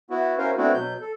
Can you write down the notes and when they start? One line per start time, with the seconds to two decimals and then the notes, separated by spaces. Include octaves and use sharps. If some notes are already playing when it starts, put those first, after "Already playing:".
0.10 B3 E4 F#4
0.38 C#4 E4 F#4 A#4 C5 F5
0.57 A3 B3 C4 D4 E4 F#4
0.74 B2 F#3 G6
1.01 A4